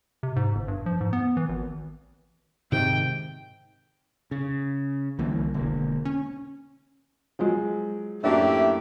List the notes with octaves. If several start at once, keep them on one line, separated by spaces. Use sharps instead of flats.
C3
G#2
G1
G2
F3
G#2
B3
E3
G#1
G#2 C3 D#3 G5
C#3
C2 D3 E3 A#3
E1 D3 A#3
C#4
F3 F#3 G#3
F#2 A2 A#3 D4 G4 E5